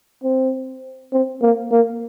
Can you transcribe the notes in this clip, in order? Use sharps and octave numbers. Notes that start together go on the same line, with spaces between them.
C4
C4
A#3
A#3